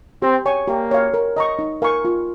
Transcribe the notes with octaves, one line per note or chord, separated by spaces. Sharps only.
C4 G4
C#5 G#5 C#6
A#3 G4
C#5 F5
A#4
D#5 A#5 C#6
D#4
A#4 F5 G#5 C#6
F4